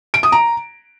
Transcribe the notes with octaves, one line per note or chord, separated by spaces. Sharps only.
D7
D#6
A#5